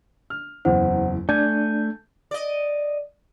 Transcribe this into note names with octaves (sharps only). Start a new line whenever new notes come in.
F6
F#1 E2 C5 F#5
A3 D4 G#5 A5 G6
D5 D#5